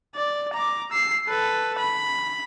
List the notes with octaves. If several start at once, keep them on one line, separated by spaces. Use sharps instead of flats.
D5
A#5 D6
E6 C7
A4 B4
B5